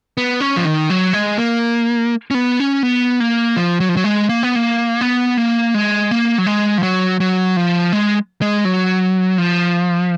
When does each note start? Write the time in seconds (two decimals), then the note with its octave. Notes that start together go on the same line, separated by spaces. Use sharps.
0.17 B3
0.40 C#4
0.57 F3
0.65 D#3
0.90 F#3
1.13 G#3
1.38 A#3
2.31 C#4
2.35 B3
2.60 C#4
2.83 B3
3.20 A#3
3.57 F3
3.80 F#3
3.89 F3
3.97 F#3
4.04 G#3
4.29 A#3
4.43 B3
4.56 A#3
5.01 B3
5.37 A#3
5.74 G#3
6.11 A#3
6.38 F#3
6.46 G#3
6.78 F3
6.83 F#3
7.20 F#3
7.57 F3
7.93 G#3
8.42 G#3
8.65 F#3
9.38 F3